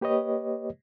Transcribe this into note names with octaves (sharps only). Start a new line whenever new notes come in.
A#3 G4 B4 C#5 D#5